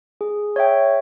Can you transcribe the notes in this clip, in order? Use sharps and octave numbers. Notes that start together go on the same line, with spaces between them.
G#4
C#5 E5 G5